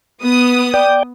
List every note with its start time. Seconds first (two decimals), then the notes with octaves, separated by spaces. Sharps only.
0.23 B3 D#6
0.74 D5 G5